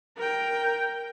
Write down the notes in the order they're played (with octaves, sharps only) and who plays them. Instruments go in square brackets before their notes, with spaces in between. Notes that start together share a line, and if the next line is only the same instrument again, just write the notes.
[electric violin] A#4 G5